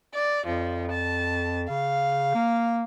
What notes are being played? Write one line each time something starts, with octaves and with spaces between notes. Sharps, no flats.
D5
F2 F3
A5
C#3 F5
A#3